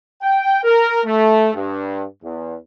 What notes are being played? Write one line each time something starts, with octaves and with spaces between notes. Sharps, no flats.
G5
A#4
A3
G2
E2